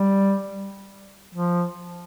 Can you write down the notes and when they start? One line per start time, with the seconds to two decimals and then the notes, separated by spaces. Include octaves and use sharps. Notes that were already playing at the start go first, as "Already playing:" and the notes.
Already playing: G3
1.35 F3